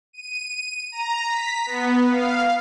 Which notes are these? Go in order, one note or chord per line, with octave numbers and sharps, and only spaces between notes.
D#7
A#5
B6
B3
F5